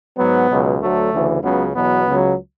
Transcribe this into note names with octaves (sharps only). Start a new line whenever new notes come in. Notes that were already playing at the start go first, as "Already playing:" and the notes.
G#2 F#3 B3
C#2 B2 F#3
D2 D3 F#3 A3
D2 C#3 E3
C#2 C#3 F#3 B3
E2 B2 F#3 B3
C#2 C#3 F#3